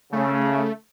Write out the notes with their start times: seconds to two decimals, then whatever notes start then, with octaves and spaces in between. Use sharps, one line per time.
0.13 C#3 A3